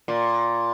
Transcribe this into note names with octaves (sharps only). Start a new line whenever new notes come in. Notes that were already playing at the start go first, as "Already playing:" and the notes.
A#2